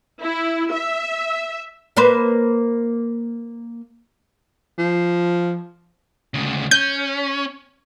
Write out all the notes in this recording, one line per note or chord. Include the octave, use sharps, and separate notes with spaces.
E4
E5
A#3 B4 C5
F3
D2 C#3
C#4 G6